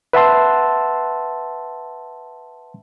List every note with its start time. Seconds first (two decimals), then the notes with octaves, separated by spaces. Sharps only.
0.13 B4 E5 F#5 A5 C6 E6